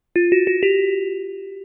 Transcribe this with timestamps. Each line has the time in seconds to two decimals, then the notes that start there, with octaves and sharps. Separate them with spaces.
0.16 F4
0.32 F#4
0.47 F#4
0.63 G4